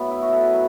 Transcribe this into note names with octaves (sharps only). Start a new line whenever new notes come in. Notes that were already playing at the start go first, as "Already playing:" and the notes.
Already playing: A2 F#3 B3
E4
F#4
A4
B4
F#3